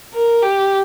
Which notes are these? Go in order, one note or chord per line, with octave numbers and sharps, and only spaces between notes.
A#4
G4